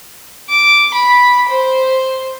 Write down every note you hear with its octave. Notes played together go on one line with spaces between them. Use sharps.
D6
B5
C5